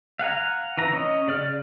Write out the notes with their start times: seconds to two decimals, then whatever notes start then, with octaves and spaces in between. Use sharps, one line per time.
0.19 F5 F#5 G#5 A#5
0.77 E3 A#5
0.93 C#4 D#5
1.28 C#3 D5 F6